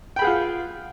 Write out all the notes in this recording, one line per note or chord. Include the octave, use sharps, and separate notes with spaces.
F4 G#4 F#5 G5 B5